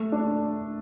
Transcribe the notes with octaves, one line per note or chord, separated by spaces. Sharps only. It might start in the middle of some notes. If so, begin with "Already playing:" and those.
Already playing: A3
D4